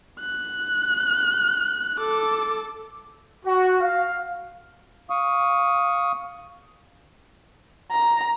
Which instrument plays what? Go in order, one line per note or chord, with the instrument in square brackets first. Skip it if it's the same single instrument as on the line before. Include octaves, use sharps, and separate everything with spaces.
[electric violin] F#6
A4 D6
[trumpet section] F#4
F5
[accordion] F5 C#6 D#6
[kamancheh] A#5